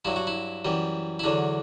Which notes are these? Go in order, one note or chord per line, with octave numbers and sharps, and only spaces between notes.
G2 F#3 E4
F#4
E4
F#2 E3 G3
E4
E2 D3 F#3 D4